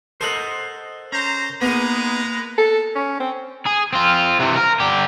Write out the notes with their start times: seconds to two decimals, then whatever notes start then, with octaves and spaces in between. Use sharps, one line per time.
0.21 A4 A#4 C5 D#5 F#5
1.12 C#4 C5 A#5
1.61 G#3 A#3 B3 D#4 G#4 B4 A#5
2.58 A4
2.95 C#4
3.20 C4
3.66 G#4
3.93 C4 F4
4.40 C3 E3
4.56 A#4
4.80 D3 G4